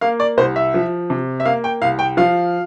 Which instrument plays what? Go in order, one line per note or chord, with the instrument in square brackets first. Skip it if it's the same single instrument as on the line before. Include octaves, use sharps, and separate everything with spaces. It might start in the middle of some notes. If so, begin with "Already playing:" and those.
[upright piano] A#3 F5
D5
C2 C5
E5
F3
C3
E5
A#3 F5
G5
C2 F5
G5
F3 F5